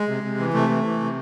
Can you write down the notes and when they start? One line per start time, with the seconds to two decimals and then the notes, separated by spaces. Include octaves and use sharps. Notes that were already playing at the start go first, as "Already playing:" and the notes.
Already playing: G#3
0.09 C3
0.24 C3
0.39 E3
0.53 C3 A3
0.69 E3
0.84 E3
1.00 C3